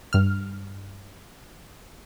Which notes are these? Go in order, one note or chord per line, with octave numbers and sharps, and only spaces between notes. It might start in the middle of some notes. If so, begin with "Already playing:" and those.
G2 F6